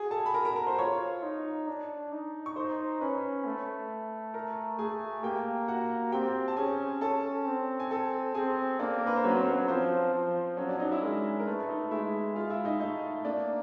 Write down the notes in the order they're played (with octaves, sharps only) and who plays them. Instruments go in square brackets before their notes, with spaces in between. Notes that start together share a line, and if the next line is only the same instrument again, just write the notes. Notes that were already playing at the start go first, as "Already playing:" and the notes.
Already playing: [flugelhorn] F#4 [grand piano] G#4 G#5
[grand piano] A4 A5
B5
A#4 A#5
A#4 A#5
A#4 A#5
C5 C6
[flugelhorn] F4 [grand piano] C#5 C#6
[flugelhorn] D#4
D4
D#4
[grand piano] C#6
[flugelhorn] D#4 [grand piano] C5 C6
[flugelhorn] C#4 [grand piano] B4 B5
[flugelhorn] A3
[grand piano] A#4 A#5
[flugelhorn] A3 [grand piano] G#4 G#5
[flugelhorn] A#3 [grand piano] G4 G5
[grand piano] F#4 F#5
[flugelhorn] C4 [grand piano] G4 G5
[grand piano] A5
[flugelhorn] C#4 [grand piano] G#4 G#5
[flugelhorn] C#4 [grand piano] A4 A5
[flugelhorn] C4
[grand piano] G#5
A4 A5
[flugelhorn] C4 [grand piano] G#4 G#5
[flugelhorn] A#3 [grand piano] D4 D5
[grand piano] A#4
B4
C5
[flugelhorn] F#3 [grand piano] C#4 C#5
[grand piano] B4
C4 C5
C4 C5
B4
[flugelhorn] F3 [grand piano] C4 C5
[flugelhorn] F3
[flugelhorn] F#3 [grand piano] C#4 C#5
[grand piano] D4 D5
D#4 D#5
E4 E5
[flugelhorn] G#3 [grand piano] A#4
[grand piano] A#4
[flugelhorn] A3 [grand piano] B4
[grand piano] D#4 D#5
[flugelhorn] G#3 [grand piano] E4 E5
[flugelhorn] G#3 [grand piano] F4 F5
[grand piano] E4 E5
D#4 D#5
[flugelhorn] A3 [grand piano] D#4 D#5
[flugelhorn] A#3 [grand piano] D4 D5